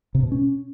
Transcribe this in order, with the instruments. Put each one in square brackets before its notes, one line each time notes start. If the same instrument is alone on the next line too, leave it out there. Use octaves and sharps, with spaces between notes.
[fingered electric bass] C3
B2
C#4